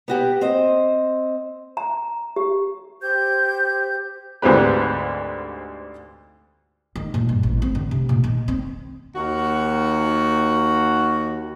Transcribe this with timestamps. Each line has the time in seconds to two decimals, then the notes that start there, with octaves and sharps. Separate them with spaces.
0.08 B3 F#4 G4
0.41 C4 C5 D#5
1.77 A#5
2.36 G4
3.01 G4 C5 G6
4.42 D2 G#2 C4 G4 B4
6.96 D#3
7.14 A#2
7.29 G2
7.43 A1
7.62 C4
7.75 D3
7.91 C3
8.09 A#2
8.24 D#3
8.48 C4
9.16 D#2 F#4